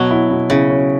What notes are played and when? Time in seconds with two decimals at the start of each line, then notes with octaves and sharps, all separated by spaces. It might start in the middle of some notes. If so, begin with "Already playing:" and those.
Already playing: B2 F#3
0.11 E4
0.31 B2
0.50 C#3 E4
0.70 C#4